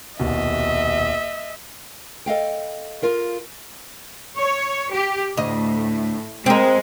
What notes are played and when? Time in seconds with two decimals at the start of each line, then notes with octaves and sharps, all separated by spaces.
0.20 D#1 C2 B2 D#5 E5
2.26 A4 D#5 F5 G5
3.02 F4 A#4 F5
4.38 C#5
4.93 G4
5.37 D2 A2 D#5
6.46 G#3 C4 A#4